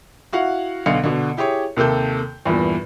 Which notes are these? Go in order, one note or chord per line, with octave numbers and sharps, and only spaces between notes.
E4 F#4 F5 F#5
B1 D3 F5 C#7
B2 D3
E4 G4 G#4 C#5
D#2 C3 A#3 A4 G6
E2 G2 A#2 E3